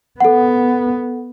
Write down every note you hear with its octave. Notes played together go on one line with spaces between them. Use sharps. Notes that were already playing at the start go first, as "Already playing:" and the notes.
B3 A4 F#5